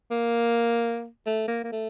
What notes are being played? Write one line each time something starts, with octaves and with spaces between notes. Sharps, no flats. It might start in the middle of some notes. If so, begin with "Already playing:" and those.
A#3
A3
A#3
A#3
A3